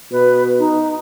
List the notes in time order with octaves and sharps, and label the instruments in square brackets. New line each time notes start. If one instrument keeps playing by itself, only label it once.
[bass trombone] B2 [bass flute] B4
[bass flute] D#4